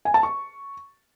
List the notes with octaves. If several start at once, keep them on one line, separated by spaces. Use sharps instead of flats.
G#5
A5
C#6